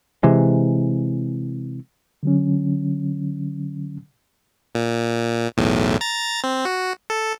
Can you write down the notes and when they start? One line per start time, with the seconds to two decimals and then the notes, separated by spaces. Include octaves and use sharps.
0.23 C3 E3 G#3
2.23 D3 F#3 C#4
4.75 A#2
5.57 B1 E2 A2
6.01 A#5 A6
6.44 C4
6.65 F#4
7.10 A4